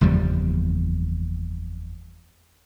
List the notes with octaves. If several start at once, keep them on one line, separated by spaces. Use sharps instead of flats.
F#1 E2 F3 G3